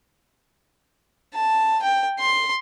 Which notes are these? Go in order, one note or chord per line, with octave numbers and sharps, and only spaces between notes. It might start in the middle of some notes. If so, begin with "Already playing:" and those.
A5
G5
C6